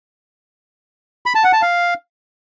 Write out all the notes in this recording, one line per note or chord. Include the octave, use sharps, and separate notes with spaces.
B5
A5
F#5
A5
F5